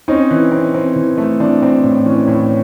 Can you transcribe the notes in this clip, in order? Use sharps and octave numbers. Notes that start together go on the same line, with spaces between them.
C4 C#4 D#4
E3
C4
C4
E3
A3
E3 C4 D4
C4
A2
E3 C#4
A2